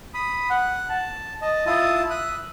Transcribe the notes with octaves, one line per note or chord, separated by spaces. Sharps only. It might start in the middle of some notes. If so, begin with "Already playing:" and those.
B5 D#6
F#5
A5
D#5 A5
E4 F4 A5 D#6
E5 D#6 F#6